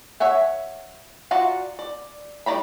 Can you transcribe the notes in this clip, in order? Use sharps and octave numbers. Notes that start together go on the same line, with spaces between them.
C#5 E5 F#5 G#5
F4 F#4 D5 F#5 A#5
D5
D#3 G3 D5 A#5 B5